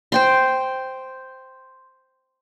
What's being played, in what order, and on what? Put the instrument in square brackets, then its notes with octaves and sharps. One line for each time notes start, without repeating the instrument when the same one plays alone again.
[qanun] C5 G5 C6